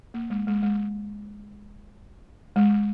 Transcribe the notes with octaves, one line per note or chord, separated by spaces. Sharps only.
A#3
G#3
G#3
G#3
G#3